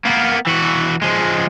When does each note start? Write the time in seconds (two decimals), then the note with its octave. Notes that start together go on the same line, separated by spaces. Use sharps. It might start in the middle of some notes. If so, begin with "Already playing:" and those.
0.05 A#3 B3
0.47 E3 F#4
1.02 F3 G#3